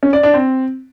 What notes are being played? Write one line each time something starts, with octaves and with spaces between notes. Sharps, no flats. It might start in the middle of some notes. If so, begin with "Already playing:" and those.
C#4
D5
D4
C4